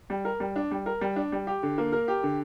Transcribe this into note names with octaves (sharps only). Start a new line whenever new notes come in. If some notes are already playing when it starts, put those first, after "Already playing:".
G3
A#4
G3
D4
G3
A#4
G3
D4
G3
G4
D3
A#3
A#4
G4
D3